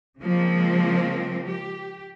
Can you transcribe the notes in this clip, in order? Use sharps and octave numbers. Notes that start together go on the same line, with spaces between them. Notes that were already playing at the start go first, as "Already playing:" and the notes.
C#3 F3 G#3 A#3 C4
G4